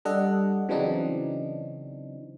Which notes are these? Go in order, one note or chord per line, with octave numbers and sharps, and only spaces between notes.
G3 D4 A4 D#5 F#5
C#3 E3 F#3 C4 D4 D#4